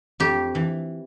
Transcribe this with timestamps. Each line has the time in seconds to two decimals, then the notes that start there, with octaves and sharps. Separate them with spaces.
0.20 F2 G4
0.55 E3